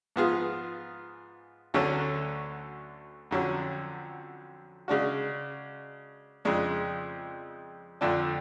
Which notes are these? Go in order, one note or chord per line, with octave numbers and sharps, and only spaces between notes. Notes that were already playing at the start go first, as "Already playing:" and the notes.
G#2 F3 B3 F4 G#4
D2 D3 F#3 A3 C#4
F2 D3 F#3 C#4
C#3 G#3 D4 F#4
F2 C#3 G#3 D4
F2 D3 F3 A3 D4